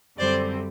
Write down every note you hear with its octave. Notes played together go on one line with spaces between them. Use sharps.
F#2 D3 G3 C4 C5 D5